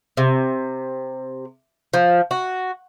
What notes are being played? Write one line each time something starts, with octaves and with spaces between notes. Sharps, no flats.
C3
F3
F#4